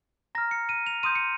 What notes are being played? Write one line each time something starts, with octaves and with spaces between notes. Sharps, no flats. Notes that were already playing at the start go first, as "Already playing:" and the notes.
A#5 F6 A#6
C#7
D#7
F7
C6 D#6 G6 D#7
C#7